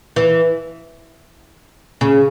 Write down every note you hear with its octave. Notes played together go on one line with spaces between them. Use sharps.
E3
C#3